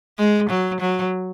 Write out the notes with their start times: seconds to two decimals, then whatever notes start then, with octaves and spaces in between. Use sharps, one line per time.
0.18 G#3
0.50 F#3
0.81 F#3